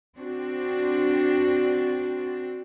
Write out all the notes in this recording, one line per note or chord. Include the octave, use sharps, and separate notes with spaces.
C4 D4 F#4